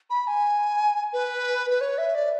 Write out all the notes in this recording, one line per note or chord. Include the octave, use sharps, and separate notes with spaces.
B5
G#5
B4
B4
C#5
E5
D5